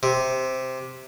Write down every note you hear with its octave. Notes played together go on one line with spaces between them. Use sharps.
C3